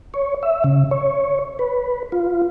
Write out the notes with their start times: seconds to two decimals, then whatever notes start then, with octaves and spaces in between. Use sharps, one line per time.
0.14 C#5
0.43 E5
0.64 C#3
0.91 C#5
1.59 B4
2.12 F4